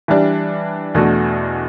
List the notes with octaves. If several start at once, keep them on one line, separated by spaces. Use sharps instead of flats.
E3 G3 D4
E2 B2 A3 D4 F#4